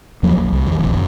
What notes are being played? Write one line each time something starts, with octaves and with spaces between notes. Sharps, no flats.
E2 F3 F#3 A#3
A#1
C2
E2 D#3
F1 A#1 F2
F#1